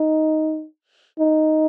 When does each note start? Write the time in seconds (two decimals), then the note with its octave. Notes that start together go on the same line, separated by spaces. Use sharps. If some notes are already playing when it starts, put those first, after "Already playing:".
Already playing: D#4
1.19 D#4